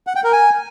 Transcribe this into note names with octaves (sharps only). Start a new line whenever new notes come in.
F#5
G5
A#4
G#5